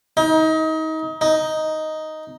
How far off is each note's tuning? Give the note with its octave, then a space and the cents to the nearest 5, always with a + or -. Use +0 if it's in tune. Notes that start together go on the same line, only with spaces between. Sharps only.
D#4 +30
D#4 +5